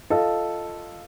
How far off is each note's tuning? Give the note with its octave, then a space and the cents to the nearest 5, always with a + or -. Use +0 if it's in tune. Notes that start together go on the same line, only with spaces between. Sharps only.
F4 -5 A4 +0 D#5 -5